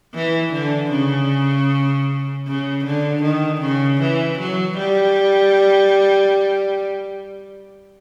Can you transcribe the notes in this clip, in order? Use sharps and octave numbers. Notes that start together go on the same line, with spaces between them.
E3
D3
C#3
C#3
D3
D#3
C#3
E3
F#3
G3